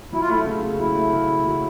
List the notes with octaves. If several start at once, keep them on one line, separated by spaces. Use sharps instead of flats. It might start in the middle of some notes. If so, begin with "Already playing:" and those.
F#3 E4
F4
A3 E4
C#3
C#3
F#3 E4
A3
C#3
C#3
F#3